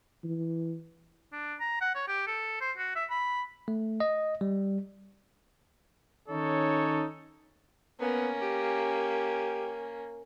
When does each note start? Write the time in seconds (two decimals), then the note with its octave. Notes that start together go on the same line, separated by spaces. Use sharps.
0.24 E3
1.33 D4
1.60 A#5
1.81 F#5
1.95 C#5
2.08 G4
2.27 A4
2.61 C5
2.78 F#4
2.96 E5
3.10 B5
3.68 A3
4.00 D#5
4.41 G3
6.29 D#3 C#4 D#4 A4 C#5
8.00 A#3 B3 C#4
8.42 G4